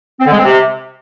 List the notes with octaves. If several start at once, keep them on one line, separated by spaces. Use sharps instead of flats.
C4
D3
G#3
C4
C3